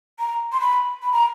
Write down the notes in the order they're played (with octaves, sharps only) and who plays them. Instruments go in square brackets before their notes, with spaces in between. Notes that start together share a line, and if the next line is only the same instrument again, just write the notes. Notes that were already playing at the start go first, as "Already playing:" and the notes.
[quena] A#5
C6
B5
B5
A#5